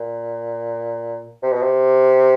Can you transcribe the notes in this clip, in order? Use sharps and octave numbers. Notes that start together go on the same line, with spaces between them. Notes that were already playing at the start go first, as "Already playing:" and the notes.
Already playing: A#2
C3
B2
C3